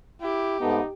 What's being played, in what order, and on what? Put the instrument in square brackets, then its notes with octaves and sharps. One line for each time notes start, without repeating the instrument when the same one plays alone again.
[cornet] E4 [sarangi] G4
[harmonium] G#2 A3 B3 [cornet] D#4